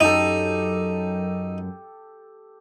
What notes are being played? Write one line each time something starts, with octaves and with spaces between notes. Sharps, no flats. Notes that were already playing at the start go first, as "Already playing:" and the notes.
F#2 D#4 G4 A4